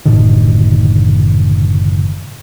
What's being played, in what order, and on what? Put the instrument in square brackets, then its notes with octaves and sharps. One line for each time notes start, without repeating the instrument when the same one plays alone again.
[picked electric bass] F#1 A2 D3 D#3